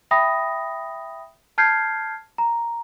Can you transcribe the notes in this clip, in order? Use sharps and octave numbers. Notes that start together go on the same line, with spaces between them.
E5 G5 B5 D#6 A#6
A5 F6 G6 G#6 C7
A#5